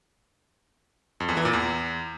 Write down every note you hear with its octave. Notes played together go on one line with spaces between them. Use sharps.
F2
E2
E3
A#2
E2